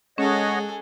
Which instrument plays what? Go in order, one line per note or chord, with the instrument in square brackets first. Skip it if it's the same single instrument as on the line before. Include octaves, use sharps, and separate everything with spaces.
[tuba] G#3 [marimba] C#4 [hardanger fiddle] G#4 A4 [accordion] C#5 D#5 F#5